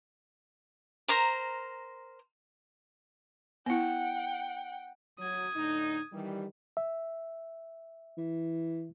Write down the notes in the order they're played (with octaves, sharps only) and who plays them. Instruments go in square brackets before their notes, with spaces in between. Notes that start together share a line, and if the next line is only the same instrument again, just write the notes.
[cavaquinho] A#4 C5 A#5
[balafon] B3 E4 [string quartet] F#5 G5
[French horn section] F#3 [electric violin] D#6 G#6
[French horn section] A2 D3 D#4
D#3 E3 G3
[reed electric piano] E5
[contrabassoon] E3